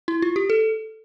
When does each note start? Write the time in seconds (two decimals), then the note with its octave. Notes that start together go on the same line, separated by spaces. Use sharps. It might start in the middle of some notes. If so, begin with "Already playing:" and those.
0.08 E4
0.22 F4
0.36 G4
0.50 A4